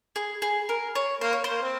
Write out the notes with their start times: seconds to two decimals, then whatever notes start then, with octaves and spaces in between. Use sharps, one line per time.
0.16 G#4
0.42 G#4
0.69 A#4
0.95 C#5
1.21 A#3 C5
1.33 C#5
1.44 C5
1.50 A#3
1.62 C4